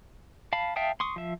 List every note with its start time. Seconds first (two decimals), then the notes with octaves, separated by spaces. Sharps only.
0.53 F5 A5 B5
0.76 E5 F5 G5 A5 D#6
1.00 C6 C#6 D#6
1.16 F3 E5